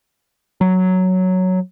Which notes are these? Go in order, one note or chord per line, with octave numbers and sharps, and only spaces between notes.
F#3